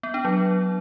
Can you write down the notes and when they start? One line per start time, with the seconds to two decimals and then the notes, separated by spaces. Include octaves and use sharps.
0.03 B3
0.14 D4
0.25 F#3